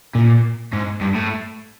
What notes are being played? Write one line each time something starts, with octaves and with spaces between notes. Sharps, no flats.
A#2
G#2
G2
A2